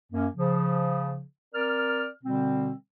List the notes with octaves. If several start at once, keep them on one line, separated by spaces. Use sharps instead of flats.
F#2 A#3 C#4
C#3 F3
C4 A#4 D5 F6
B2 D3 G3 C4